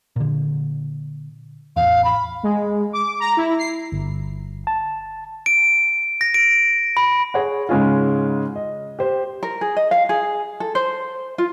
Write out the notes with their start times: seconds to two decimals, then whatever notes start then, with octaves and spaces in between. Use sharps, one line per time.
0.16 A#2 D3
1.76 A1 E2 F5
2.04 B5
2.43 G#3
2.93 D6
3.20 A#5
3.37 E4
3.58 C7
3.92 G1
4.67 A5
5.46 D7
6.21 A#6
6.34 D7
6.97 B5
7.34 G#4 C#5 F#5
7.69 G#2 C#3 G#3 C#4 F4
8.56 D#5
8.99 G4 C5
9.43 A#4
9.61 G#4
9.77 D#5
9.91 F5
10.09 G#4
10.60 A4
10.75 C5
11.38 F4